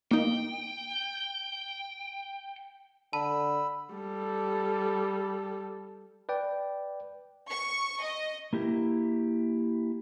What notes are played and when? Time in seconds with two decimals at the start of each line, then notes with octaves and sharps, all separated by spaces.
0.11 A#3 D#4 G5
3.13 D3 A5 B5 E6
3.94 G3 A4
6.29 B4 D5 G5
7.49 C#6
8.02 D#5
8.53 A#3 E4 G4